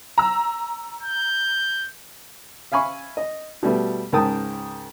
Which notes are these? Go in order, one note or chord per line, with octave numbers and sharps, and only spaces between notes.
A#5 E6
G6
E5 F5 G#5 B5 C#6
D#5
B2 G3 A3 B3
C#2 G#2 A#4 G5 A5 D#6